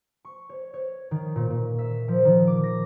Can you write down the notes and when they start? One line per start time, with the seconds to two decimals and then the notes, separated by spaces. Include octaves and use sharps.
0.25 C#6
0.49 C#5
0.74 C#5
1.11 D#3
1.36 A#2
1.50 A#2
1.78 E5
2.08 F3
2.25 D#3
2.47 D6
2.63 A#6